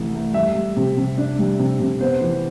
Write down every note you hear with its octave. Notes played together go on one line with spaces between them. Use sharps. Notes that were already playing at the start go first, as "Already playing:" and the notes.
Already playing: C2 E3 A3
A3
G3 E5
G3
C3
C3
D4
G3
C3
C3
B3 C5
E3